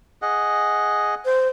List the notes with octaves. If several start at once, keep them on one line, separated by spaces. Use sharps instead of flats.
G#4 D#5 F#5
C5